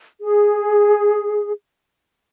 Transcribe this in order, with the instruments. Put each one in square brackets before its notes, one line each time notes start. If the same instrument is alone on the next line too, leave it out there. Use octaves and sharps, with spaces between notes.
[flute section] G#4